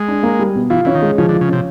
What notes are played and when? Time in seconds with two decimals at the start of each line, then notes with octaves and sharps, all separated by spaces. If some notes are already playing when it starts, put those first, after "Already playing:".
Already playing: G#3
0.08 D4
0.23 A#3
0.39 G3
0.55 B2
0.70 E3 F4
0.85 E3 C#4
0.95 D#3
1.02 G#3
1.18 C#3 F3
1.29 D3
1.34 F4
1.41 C#3
1.49 C3 C#4